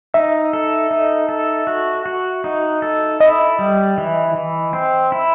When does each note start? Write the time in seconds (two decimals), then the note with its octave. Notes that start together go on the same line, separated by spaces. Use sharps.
0.14 D#4 E5
0.53 A4
0.91 D#4
1.29 A4
1.67 F#4
2.06 F#4
2.44 D#4
2.82 A4
3.20 E4 D#5
3.59 G3
3.98 E3
4.35 E3
4.73 C4
5.12 E4